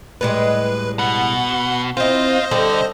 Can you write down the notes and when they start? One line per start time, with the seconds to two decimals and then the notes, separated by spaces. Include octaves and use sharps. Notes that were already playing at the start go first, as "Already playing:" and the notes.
0.21 A2 G3 G#3 B4
0.99 B2 F#5
1.97 C4 E4 F4 C5 D#5
2.51 D3 G3 A4